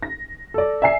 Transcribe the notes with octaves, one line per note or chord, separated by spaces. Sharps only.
A#6
A4 D5
D5 E5 G#5 C7